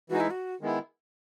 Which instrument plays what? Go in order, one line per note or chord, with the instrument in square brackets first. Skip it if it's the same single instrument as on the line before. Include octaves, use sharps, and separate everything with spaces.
[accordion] E3 G#3 D#4 [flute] F#4
[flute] E4
F#4
[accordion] D#3 G#3 B3 E4